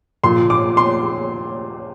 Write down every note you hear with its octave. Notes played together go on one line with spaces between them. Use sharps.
A#2 F3 C6
D6
C6